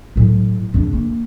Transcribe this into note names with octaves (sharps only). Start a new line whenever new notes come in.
A2 F#3
C#3 D4
A#3